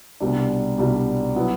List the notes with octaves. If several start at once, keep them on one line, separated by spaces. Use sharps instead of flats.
C2 B2 G3 D4
C2 B2 G3 D4
F#3 B3 E4